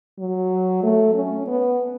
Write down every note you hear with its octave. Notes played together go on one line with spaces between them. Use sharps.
F#3
A3
C#4
B3